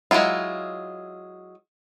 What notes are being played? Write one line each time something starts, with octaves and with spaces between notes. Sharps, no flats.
F#3 G#3 A3 E4 F4